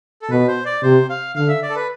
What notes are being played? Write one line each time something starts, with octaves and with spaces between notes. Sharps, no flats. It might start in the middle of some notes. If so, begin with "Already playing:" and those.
A4
B2 B4
C5
D5
C3 C5
F5
D3 F5
E5
D5
A4
B4